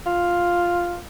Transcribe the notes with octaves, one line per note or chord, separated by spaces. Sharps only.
F4